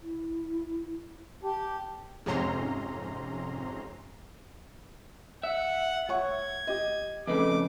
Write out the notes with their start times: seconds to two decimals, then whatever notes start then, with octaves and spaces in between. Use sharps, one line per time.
0.02 E4
1.43 G4 A5
2.26 F2 G#2 C3 C#4 A#5 C6
5.43 E5 F#5
6.09 C#5 F#5 C#6 G#6
6.67 G4 D#5
7.27 F2 C#3 A3 B4 D#5 D6